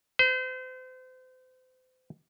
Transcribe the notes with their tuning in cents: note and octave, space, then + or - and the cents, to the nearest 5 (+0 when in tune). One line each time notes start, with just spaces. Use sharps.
C5 -35